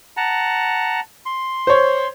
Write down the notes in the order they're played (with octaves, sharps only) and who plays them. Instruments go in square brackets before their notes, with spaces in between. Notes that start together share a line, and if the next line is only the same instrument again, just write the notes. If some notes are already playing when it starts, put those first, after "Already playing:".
[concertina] F#5 A5 A#5
C6
[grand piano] C5 C#5